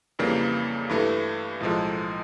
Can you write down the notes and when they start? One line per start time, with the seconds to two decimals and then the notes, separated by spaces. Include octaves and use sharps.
0.19 F2 C#3 E3 G3 A#3
0.89 G2 E3 A3
1.60 B1 A2 F3 G#3